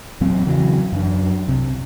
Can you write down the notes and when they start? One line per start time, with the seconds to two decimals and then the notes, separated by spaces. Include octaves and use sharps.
0.20 E2 A#2 F#3 C4
0.46 C#3 E3 F#3
0.92 F#2 F#3 D4
1.48 C2 C3